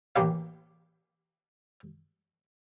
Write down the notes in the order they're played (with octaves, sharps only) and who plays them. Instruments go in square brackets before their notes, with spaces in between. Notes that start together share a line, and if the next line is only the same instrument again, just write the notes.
[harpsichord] A1 A#3 G4 F5